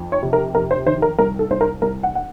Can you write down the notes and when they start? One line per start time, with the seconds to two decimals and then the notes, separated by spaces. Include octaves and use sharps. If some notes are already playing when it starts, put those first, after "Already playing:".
Already playing: F2 F3
0.12 C#5
0.23 C3
0.33 A#4
0.55 F2 A#4
0.71 C5
0.86 D#3 C5
1.02 A#4
1.19 C2 A#4
1.39 A4
1.50 C2 C5
1.61 A#4
1.82 C2 A#4
2.03 F#5
2.15 F#5